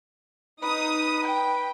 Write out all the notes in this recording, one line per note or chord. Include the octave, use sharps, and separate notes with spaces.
D#4 B4 D#6
G5